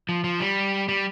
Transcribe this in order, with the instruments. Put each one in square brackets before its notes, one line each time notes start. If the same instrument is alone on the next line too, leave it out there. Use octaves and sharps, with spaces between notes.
[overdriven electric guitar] F3
F3
G3
G3